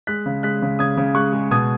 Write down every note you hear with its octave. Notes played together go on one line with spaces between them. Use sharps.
G#3 F#6 B6
C#3
G#3 F#6 B6
C#3
C#3 D#6 G#6
C#3
G#3 C#6 F#6
G#3
B2 D#6 G#6